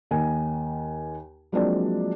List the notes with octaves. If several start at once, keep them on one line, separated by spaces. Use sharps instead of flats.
D#2 D#3 G#5
F3 F#3 G#3 A#3 C4 D4